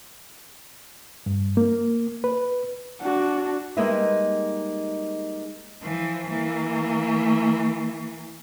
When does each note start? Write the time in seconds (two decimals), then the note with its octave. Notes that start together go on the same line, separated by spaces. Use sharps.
1.26 G2
1.57 A#3
2.24 B4
3.01 D4 F#4
3.77 G3 G#3 A#3 D#4 B4 E5
5.82 E3 F3
6.29 E3 A#3